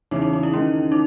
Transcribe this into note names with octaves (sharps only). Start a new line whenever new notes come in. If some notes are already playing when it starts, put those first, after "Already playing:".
E2 C#3 E3 D#4
D#4
D#4
E4
D#3 G#3 C#4 D#4
D#4